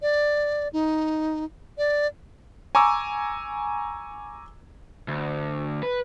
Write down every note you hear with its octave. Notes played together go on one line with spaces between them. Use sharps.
D5
D#4
D5
G#5 A#5 C#6 D6 E6
D2
B4